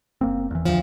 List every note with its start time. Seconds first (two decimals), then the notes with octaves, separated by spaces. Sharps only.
0.21 F#1 A#3 C4
0.51 E2 E3
0.65 D2 F3